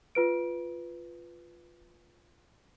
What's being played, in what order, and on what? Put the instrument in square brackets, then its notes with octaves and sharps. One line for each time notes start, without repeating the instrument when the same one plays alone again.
[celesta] F4 B4 D7